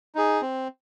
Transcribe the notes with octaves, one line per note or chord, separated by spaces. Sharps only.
D#4 G#4
C4